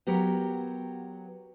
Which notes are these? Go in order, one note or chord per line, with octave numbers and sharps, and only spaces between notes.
F#3 B3 G4 A#4